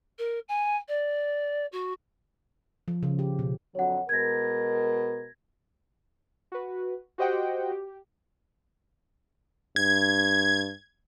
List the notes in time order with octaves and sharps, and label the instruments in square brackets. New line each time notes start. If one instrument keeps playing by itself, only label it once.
[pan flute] A#4
G#5
D5
F#4
[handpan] F3
C#3
G4
B2
[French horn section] F2 D3 F#3 [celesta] C#5 F#5
[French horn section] B2 G#3 A#4 [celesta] G#6 A#6
[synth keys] F#4 B4
F#4 G4 C5 D#5 F#5 G5
G4
[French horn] G2 [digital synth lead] G#6